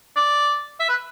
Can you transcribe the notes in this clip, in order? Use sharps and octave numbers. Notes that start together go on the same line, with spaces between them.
D5
E5
B4